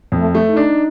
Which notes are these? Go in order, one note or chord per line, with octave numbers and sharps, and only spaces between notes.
F2
A3
A3
D#4
D4